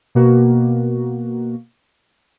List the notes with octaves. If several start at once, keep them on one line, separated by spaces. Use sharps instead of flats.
B2 A#3 F#4